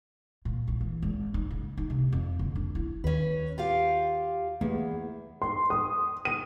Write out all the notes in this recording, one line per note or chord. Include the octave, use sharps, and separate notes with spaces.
A#2
A#1
E3
G#1
D#4
C#3
D#4
C3
F2
D3
D4
E4
D#2 C#4 B4
F4 G4 F5
E2 A3 A#3
C6
D#6
D#7